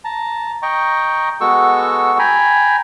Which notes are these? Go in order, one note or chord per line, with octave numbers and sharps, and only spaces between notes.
A5 A#5
D#5 G5 A#5 C#6
G#3 B3 F#4 A4 C#6 E6
G5 G#5 A#5 B5